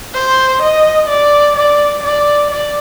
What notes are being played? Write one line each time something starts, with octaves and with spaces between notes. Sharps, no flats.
C5
D#5
D5
D5
D5
D5